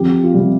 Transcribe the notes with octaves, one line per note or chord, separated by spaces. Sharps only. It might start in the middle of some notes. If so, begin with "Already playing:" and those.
Already playing: F2 G4
F4
C3 G3 G4